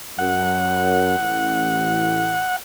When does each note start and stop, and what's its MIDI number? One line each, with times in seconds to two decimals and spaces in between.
0.19 1.16 42
0.19 2.56 78
1.19 2.44 33